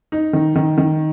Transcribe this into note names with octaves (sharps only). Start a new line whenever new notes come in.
D#4
D#3
D#3
D#3